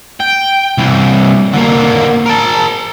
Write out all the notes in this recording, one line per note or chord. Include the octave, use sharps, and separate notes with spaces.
G5
C2 E3
D3 A#3
A#4 A5